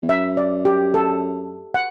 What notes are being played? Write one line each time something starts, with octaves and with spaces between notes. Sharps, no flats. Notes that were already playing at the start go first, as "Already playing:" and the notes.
E2
F#2 E5
D5
G4
A4
F#5